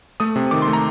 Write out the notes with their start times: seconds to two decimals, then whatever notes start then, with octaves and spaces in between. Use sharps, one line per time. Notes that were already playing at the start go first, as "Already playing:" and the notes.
0.20 A3 D#6
0.36 C3
0.51 D#3 D6
0.62 C6
0.67 A3
0.73 A#5